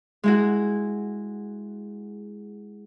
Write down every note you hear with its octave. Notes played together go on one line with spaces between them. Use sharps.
G#3 E4 F#4